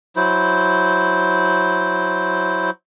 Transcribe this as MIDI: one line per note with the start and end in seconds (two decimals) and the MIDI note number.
0.16 2.70 54
0.16 2.70 64
0.16 2.70 72